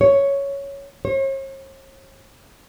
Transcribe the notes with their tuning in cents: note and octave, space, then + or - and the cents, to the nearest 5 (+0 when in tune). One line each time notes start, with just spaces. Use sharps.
C#5 +5
C#5 -45